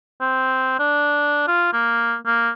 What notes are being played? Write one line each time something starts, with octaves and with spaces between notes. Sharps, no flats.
C4
D4
F4
A#3
A#3